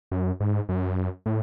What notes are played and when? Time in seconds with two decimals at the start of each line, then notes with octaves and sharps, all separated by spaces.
0.12 F#2
0.40 G#2
0.69 F#2
1.26 A2